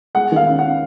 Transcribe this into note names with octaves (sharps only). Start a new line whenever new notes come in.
G#3 F#5
D#3 F5
C#4
C#4 F#5